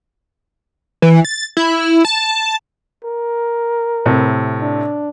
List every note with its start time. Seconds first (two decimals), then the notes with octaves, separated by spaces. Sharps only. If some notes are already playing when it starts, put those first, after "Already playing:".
1.02 E3
1.25 A6
1.57 E4
2.05 A5
3.05 A#4
4.06 A2 C3
4.61 D4